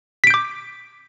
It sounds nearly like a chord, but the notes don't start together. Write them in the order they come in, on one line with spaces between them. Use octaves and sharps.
B6 D7 G6 D6